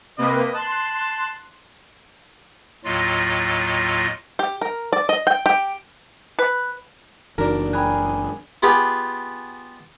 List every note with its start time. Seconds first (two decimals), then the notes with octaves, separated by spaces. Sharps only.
0.18 C3 A#3 B4 D#5
0.54 A5 C6 F#6
2.85 D#2 A2 F#3 F4 D#5
4.39 G4
4.61 A#4
4.93 D5
5.09 D#5
5.27 G5
5.46 G4
6.39 B4
7.38 F#1 E3 D4 D#4 F#4 A#4
7.73 G#4 G5 B5 F#6
8.63 B3 F4 G4 G#4 B4 F5